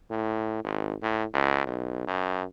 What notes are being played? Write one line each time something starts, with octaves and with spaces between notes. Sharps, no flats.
A2
G#1
A2
C#2
B1
F#2